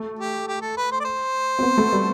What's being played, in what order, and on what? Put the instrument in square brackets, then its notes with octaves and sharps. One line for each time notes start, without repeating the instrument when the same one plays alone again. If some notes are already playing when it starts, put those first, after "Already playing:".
Already playing: [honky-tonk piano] A3
[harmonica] G4
G4
A4
B4
C5
D5
C5
[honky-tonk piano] C4
B3
A3
G3